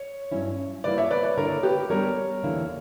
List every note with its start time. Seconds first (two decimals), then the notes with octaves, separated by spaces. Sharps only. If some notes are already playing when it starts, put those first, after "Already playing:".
Already playing: C#5
0.32 G2 F#3 C#4 E4
0.84 G3 A#3 E4 B4 D5
0.98 C#5 E5
1.11 B4 D5
1.23 B4 D5
1.37 D3 A#3 E4 A#4 C#5
1.63 G4 B4
1.90 G3 B3 D4 G4 A#4 C#5
2.43 E2 D3 A#3 E4